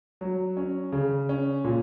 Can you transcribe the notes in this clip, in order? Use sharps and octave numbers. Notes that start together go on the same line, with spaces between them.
F#3
C#4
C#3
C#4
A#2